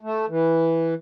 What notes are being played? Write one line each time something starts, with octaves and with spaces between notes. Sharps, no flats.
A3
E3